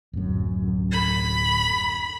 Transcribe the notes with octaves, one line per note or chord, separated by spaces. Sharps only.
D1 F#2
B5